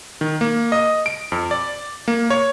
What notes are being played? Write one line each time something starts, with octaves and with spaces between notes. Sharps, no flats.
D#3
A#3
D#5
D7
F2
D5
A#3
C#5